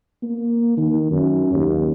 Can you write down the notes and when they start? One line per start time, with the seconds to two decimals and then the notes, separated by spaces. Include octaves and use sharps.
0.23 A#3
0.77 D#3
1.11 F#2
1.54 D#2